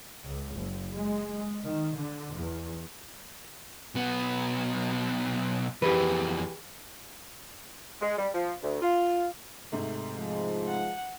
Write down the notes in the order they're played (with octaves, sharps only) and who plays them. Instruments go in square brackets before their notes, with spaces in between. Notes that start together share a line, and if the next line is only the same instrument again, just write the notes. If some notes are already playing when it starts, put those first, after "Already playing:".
[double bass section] C#2
F#1
G#3
D#3
D3
E2
[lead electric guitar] B1 B3
[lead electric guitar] F2 E3 [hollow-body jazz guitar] G4 G#4 B4
[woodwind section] G#3
G3
F3
D2
F4
[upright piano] G#2 C3 A3
[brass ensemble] F3 G#3
[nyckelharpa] F#5